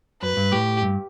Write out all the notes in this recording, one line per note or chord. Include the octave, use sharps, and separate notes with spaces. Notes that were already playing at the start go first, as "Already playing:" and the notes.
F#2 B4
G2
A2 G4
G2